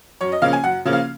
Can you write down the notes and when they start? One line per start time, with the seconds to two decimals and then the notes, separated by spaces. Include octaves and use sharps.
0.21 F#2 C#5
0.32 D#5
0.42 C#3 F3 A#3 C#4 F5
0.53 G#5
0.64 F#2 F#5
0.85 C#3 F3 A#3 C#4
0.93 F5